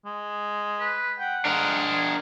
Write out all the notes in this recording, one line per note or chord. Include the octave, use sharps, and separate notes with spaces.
G#3
B4
F#5 G5
G#3 D4 A#4
G#5